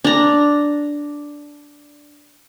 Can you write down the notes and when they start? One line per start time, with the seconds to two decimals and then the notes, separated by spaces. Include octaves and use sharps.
0.04 D4 A#5